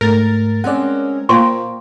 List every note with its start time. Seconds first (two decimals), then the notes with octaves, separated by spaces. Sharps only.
0.01 G#2 A3 A#4 A6
0.64 G#3 C4 C#4 D5 F#5
1.29 A#2 A#3 C5 G5 C6 C#6